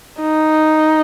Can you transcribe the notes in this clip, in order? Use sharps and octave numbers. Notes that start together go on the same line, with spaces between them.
D#4